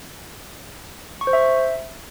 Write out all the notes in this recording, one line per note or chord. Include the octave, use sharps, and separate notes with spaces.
C#6
C5
E5